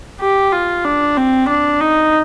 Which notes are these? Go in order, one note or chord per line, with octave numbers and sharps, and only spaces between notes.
G4
F4
D4
C4
D4
D#4